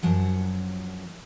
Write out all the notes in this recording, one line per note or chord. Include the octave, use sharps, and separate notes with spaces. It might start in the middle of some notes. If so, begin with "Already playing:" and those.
F#2 F3 F#3 F#5